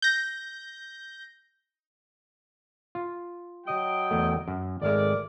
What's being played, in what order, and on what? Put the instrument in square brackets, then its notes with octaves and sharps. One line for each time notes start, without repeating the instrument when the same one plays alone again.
[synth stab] G6 A#6
[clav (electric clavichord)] F4
[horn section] F#3 D#5 G5
[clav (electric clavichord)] E2 A3
F#2
[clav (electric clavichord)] G#1 G#3 [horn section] A3 A#4 D5